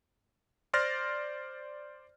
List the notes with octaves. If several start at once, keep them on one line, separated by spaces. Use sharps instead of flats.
C5 D5 C6 F6 A6 A#6